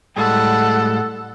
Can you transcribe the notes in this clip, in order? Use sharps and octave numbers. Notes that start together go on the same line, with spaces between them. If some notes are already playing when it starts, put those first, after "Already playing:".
A2 G3 G#3 A4 F#5